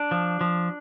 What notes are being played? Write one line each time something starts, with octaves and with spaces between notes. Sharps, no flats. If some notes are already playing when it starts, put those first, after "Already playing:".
Already playing: D4
F3
F3